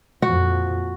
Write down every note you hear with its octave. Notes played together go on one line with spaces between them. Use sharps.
F2 A#2 F3 F#4